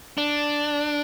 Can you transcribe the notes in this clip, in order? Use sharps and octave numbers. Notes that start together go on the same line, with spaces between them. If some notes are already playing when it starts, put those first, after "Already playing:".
D4